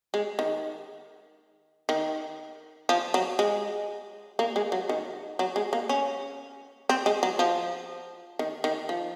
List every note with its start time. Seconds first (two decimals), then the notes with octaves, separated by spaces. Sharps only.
0.14 G#3
0.39 D#3
1.89 D#3
2.89 F3
3.14 F#3
3.39 G#3
4.39 A#3
4.56 G#3
4.72 F#3
4.89 D#3
5.39 F#3
5.56 G#3
5.73 A#3
5.89 C#4
6.89 C4
7.06 G#3
7.23 F#3
7.39 F3
8.39 D#3
8.64 D#3
8.89 F3